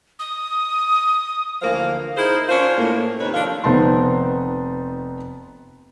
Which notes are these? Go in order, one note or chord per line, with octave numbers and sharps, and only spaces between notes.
D#6
D2 E3 F3 A#3 F5
D#4 E4 G#4 A#4 C5
C#4 D4 F4 A#4 C5 C#5
A2 A#3
D#2 C3 D#4 B4 C#5
F3 D4 F4 A4 C#5 F5
F1 B3 C4 D#4 A5 C6